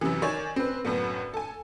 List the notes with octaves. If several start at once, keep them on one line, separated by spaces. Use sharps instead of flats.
F#2 C3 E3
D#3 C#5 D5 G#5 E7
C4 B4
F#2 A2 D3 B3
A4 G#5